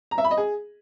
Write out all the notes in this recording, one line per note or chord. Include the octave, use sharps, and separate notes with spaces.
A#5
E5
B5
D#5
G#4